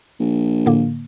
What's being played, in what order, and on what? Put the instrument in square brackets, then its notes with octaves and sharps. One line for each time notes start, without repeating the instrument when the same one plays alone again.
[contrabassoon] A#1
[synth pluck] A2 D3 A#3